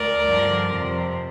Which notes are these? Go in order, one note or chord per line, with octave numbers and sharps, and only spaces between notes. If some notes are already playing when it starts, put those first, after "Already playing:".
Already playing: D2 A#4 D5
G2 D3 F3
F2 C3 F3